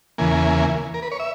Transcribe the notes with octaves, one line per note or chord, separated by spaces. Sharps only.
E2 C#3 E3 A#3 G#5
A#4
B4
C#5
E5